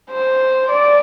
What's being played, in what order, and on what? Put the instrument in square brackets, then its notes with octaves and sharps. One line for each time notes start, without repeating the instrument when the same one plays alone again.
[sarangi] C5
D5